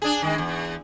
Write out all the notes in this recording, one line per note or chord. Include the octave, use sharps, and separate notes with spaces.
D4 G#4
D#3 G#3
E2